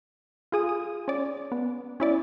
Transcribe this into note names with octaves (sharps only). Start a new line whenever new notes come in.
F4 G#4 D#6
D#6
C#4 D5
B3
C#4 E4 D5